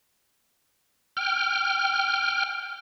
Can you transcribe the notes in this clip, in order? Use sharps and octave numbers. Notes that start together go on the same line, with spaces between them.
G5 F6